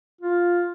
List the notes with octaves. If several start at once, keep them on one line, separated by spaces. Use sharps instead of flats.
F4